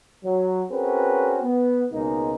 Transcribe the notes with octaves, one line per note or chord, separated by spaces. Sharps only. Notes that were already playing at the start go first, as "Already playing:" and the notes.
F#3
C4 C#4 F#4 G#4 A#4 B4
B3
C#2 B2 G#3 A#3 D#4